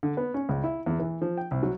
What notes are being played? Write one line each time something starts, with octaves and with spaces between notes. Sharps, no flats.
D3
B3
C#4
C#2
E4
E2
E3
F3
G5
C2
F#3